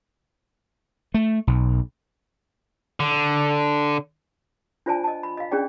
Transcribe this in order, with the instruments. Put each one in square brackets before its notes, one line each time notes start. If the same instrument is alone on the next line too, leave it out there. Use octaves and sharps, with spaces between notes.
[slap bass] A3
B1
[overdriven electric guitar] D3
[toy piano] D4 F4 C5 D5 G#5 A5
D#5 A5
B5
D#5 F5
C#4 D4 G#4 D5 G5